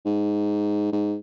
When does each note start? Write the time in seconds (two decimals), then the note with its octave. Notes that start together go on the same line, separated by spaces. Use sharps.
0.06 G#2
0.92 G#2